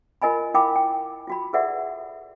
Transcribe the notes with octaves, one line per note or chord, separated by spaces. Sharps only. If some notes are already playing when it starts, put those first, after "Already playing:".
F4 A#4 D#5 G#5 B5
E4 A#4 F5 G5 B5 D6
G5
F4 F#4 B5
G#4 A4 B4 D5 E5 F#5